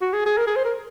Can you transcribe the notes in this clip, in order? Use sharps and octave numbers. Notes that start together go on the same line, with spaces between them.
F#4
G#4
G#4
A#4
G#4
C5
A#4